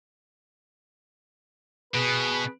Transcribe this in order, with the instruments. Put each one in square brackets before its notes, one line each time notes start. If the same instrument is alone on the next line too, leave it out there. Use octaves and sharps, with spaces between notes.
[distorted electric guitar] B2 [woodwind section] G#4 B4